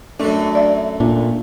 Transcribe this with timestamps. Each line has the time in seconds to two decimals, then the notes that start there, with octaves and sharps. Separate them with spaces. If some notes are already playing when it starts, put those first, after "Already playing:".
0.20 F#2 A3 D4
0.55 D5 E5
1.00 A#2 D4